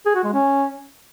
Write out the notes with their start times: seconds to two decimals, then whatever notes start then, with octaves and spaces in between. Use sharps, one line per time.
0.06 G#4
0.15 F#4
0.24 G#3
0.33 C#4